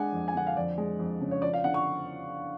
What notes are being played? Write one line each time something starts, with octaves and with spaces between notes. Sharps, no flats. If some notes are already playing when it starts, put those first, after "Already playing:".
Already playing: G#3 D4 F#5 G#5
F2
G#5
D3 F#5
F5
F2 D5
G#3
F2
C#3
C#5
F3 D5
F5
D3 F#5
C#6